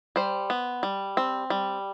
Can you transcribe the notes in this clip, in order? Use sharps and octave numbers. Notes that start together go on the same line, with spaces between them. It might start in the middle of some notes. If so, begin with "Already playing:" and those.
G3 C5
B3
G3
C4
G3